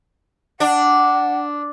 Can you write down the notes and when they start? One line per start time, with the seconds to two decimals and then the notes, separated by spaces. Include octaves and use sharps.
0.60 D4 F#5